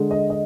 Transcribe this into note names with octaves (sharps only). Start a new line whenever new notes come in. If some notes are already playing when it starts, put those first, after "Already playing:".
Already playing: D3 G#3
D#5
D#5